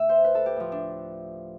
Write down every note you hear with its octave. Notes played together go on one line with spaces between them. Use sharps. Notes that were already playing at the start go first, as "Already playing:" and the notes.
Already playing: D2 D3 E5
C5
B4
A4
G4
A2 F3
D4